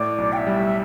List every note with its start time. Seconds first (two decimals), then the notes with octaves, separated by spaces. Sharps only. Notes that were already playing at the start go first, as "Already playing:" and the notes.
Already playing: A2 D5
0.18 B1
0.32 G5
0.36 E5
0.47 G3